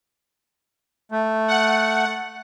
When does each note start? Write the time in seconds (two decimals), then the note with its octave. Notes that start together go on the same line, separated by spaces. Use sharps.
1.12 A3
1.48 F#5